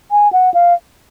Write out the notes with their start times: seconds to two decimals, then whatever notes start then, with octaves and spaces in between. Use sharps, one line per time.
0.11 G#5
0.33 F#5
0.54 F5